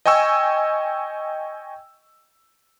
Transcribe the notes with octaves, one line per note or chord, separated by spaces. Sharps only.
D#5 G5 G#5 C#6 E6